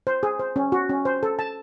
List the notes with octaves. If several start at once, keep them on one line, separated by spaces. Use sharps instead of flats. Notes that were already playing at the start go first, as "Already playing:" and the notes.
C5
G#4
C5
C#4
F#4
C#4
C5
A4
A5